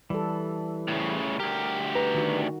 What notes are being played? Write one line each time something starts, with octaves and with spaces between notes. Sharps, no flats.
E3 G3 A4
A2 C#3
D2 G4 A#4
B4 A#5
D#3 F#4